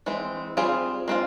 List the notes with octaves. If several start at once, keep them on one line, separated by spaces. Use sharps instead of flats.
E3 G#3 C4
G3 C4 F4 G#4
G#3 C4 F4